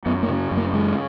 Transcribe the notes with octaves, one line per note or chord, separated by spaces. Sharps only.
F#2 B3
A#3
C#3
F#2
A#3
C#3 G#3